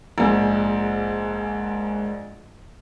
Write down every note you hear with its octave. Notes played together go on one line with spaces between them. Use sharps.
A#1 G#2